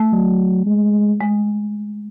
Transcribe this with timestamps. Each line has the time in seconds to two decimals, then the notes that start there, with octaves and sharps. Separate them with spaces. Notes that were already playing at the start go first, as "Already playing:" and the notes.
Already playing: A3
0.13 F#3
0.66 G#3
1.21 G#3